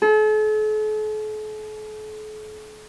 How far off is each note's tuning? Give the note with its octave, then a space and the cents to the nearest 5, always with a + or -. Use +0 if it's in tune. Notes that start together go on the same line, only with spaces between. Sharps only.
A4 -45